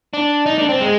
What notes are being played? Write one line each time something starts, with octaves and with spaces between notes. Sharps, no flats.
D4
D#4
D4
C4
G#3